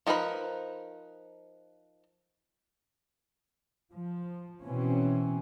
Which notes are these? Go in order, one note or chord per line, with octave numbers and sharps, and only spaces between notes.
F3 D#4 A#4 B4 B5
F3
B2 E3 C4 C#4